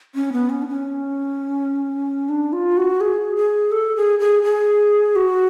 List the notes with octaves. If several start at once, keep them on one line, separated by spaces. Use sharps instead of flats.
C#4
B3
C#4
D4
C#4
D4
F4
F#4
G#4
G#4
A4
G#4
G#4
G#4
F#4